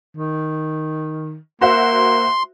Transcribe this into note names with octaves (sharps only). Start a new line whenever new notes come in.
D#3
A#3 F#4 C5 E5 C6